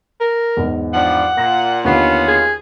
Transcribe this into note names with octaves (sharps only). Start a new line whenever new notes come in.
A#4
E2 G#2
G2 F3 D5 F#5
A#2 A#6
D#2 D3 B3 C#4 F4
G#4